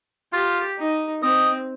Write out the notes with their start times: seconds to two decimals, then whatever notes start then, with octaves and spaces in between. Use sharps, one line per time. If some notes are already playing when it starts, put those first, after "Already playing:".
0.33 F4 G4
0.78 D#4
1.22 C4 D#5